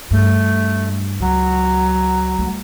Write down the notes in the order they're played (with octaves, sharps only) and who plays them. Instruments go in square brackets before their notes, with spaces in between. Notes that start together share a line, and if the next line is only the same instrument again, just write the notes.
[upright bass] G2 [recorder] A3
[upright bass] C#2 [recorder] F#3
[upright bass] G3 A3